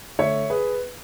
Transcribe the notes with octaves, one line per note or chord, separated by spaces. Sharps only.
D3 A3 C#5 E5
G#4 B4